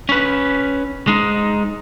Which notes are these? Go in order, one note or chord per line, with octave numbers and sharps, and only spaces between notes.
C#4 B4
G#3 D#4